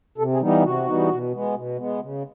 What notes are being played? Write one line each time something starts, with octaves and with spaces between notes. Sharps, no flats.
C3 A4
G#4
E3 G3 B3 D#4
G4
C3 F#4
E3 G3 B3 D#4
B2
G#3 B3
B2
G#3 B3
C#3